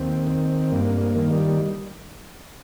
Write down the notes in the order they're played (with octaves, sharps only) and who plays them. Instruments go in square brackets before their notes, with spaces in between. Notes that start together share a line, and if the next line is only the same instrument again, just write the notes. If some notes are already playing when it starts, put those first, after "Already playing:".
Already playing: [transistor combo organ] D#2 C4
D#3
G2 A#3
A#3
D#3
G3